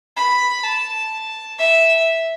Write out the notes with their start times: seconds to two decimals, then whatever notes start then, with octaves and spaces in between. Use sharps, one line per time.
0.16 B5
0.64 A5
1.59 E5